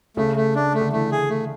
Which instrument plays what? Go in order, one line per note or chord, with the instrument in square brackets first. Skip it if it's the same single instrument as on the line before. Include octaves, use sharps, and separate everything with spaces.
[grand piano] C#3 [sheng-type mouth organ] A3
[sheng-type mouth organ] A3
D4
A3
[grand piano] D3
[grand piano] E3 [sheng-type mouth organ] A3
[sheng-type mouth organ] G#4
A3